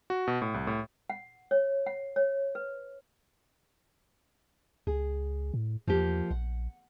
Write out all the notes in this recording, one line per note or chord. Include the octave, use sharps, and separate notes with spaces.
F#4
B2
A2
C2
A2
F#5
C#5
F#5
C#5
B4
C#2 G#4
A2
E2 F3 A#3 G4
A#1 F#5